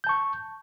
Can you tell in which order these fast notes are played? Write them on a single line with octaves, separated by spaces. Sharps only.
G6 A5 C#6